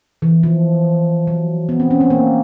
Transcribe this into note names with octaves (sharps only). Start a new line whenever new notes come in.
E3
F3
F#3
B3
C4
C#4
C4
A#3